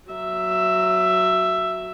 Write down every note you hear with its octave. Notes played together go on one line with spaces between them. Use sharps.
F#3 E5